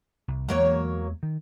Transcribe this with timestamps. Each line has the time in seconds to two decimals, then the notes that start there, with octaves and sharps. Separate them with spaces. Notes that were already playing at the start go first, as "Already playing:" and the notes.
0.28 C2
0.49 E2 E3 F#3 G#3 A#3 C#5
1.23 D#3